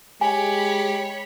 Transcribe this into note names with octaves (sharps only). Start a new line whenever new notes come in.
G#3 G4 C#5 G#5 B5